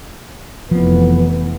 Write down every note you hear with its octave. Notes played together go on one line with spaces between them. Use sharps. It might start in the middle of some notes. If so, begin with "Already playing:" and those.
F1 E3 F3 B3